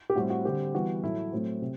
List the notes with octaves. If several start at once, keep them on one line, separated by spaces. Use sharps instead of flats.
G4
A2 G3 C4 F#4
F#4
D3 G3 C4 G4
E3 G3 B3 F#4
A2 F#3 A3 E4
A2 F#3 A3 C4
C3